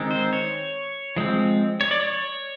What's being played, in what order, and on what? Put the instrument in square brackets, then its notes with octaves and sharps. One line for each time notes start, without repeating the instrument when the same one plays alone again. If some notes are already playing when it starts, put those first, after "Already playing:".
Already playing: [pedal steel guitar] D#3 G#3 C4
C5
C#5
F3 G#3 C4
C#5
D5
C#5